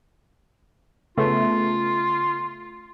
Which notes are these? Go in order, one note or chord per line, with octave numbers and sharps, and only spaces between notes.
C#3 A3 B3 F4